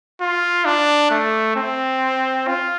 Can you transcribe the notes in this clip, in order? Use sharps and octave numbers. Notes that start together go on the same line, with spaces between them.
F4
D4
A3
C4
F4